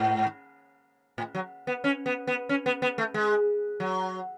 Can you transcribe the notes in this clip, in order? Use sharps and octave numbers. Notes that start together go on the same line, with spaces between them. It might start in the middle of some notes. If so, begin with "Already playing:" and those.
Already playing: G#2
A2
F#3
B3
C#4
B3
B3
C#4
B3
B3
A3
G#3
F#3